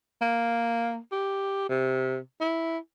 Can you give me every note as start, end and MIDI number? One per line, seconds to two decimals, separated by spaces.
0.21 0.99 58
1.12 1.65 67
1.69 2.18 48
2.41 2.78 64